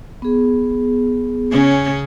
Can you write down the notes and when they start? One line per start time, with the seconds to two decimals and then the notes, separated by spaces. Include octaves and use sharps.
0.22 B3 G#4
1.51 C#3 C#4